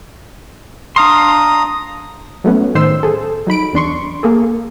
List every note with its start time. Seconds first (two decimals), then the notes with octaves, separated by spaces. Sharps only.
0.96 D4 F5 A#5 C6 D#6
2.44 F#3 A3 B3 C#4
2.75 A2 D#3 C5 C6 E6
3.03 G#4 A4
3.47 F#3 D#4 B5 D7
3.73 E2 D4 C6 C#6
4.23 A#3 G#4 A4